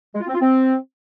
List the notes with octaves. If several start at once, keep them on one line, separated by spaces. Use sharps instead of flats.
G#3
F4
C4
F4
C4